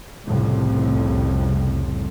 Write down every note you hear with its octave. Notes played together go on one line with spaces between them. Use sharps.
C2 F2 A2 C#3